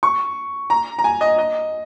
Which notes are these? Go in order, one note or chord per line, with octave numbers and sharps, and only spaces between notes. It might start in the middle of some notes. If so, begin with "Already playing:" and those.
C#6
A#5
A#5
G#5
D#5
D#5